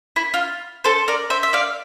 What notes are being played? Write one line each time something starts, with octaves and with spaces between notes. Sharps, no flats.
E4
F4
A4 C5
A#4 D5
C5 E5
E5
D5 F5